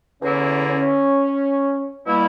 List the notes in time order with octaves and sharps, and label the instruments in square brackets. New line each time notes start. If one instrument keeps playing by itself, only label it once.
[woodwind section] E2 D3 A#3 E4 [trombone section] C#4
[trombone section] C#4
[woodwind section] B2 G3 A#3 E4